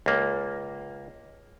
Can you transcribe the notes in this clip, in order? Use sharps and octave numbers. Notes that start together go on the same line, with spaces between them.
C#2 A#3